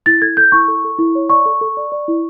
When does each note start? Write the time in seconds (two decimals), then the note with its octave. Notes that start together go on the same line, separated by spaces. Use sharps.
0.06 E4 A6
0.22 A4 G#6
0.37 A4 G6
0.52 E4 C#6
0.68 A4
0.84 A4
0.99 E4
1.15 C#5
1.30 D5 C#6
1.46 A4
1.61 A4
1.77 D5
1.92 D5
2.08 E4